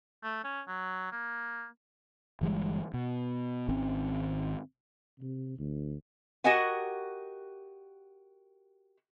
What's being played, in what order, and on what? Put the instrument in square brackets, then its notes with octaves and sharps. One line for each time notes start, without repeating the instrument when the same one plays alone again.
[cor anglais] A3
C#4
F#3
A#3
[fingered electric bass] G1 E3 G3 G#3
B2
G#1 D#3 C4 C#4
[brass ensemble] C3
D2
[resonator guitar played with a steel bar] F#4 G4 A#4 D#5 F#5 G#5